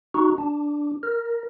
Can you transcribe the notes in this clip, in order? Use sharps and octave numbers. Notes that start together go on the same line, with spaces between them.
D#4 F#4
D4
A#4